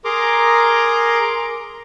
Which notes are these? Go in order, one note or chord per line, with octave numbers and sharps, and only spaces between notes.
G#4 A#4 A#5 C6 D6